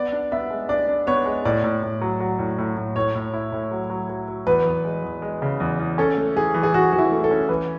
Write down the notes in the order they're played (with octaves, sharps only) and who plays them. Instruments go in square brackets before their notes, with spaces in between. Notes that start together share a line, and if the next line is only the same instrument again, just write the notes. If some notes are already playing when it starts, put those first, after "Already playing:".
Already playing: [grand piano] B3 [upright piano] D5
[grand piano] D4
[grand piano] B3 [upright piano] E5
[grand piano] G#3
[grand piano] D4 [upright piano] D5
[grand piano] D4
[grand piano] B3 [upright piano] C#5
[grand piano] G#3
[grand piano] A2 [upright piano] D5
[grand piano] A2
A2
F#3
F#3
A2
A2
A2
[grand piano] A2 [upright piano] C#5
[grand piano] A2
E4
A2
F#3
F#3
F#3
F#3
[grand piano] E2 [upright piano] B4
[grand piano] E2
G#3
E2
G#3
C#3
E2
E2
[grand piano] C#4 [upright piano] A4
[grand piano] A3
[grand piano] E3 [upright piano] G#4
[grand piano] E3
[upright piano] G#4
[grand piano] E3 [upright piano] F#4
[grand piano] E3 [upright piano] F#4
[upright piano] E4
[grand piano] A3
[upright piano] A4
[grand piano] C#4
[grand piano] E3 [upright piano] B4